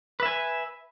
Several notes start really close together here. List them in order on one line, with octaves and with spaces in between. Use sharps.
B4 E5 G#5